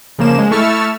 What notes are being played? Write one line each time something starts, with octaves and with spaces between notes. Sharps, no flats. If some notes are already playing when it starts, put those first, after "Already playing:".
C#3 F3 A#3 E7
G#3
A3 E4 C#6 E6 F6 A6